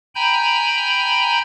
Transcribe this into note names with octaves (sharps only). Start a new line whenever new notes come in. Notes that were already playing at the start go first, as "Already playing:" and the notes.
G5 G#5 A#5 B5 G6